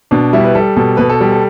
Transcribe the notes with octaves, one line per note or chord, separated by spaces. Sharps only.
B2 D4
G3 E4
B4
G3 A4
B2 A4
B2 B4
A4
G3
A4